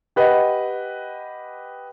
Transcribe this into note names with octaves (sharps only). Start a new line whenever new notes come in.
G4 B4 D#5 F#5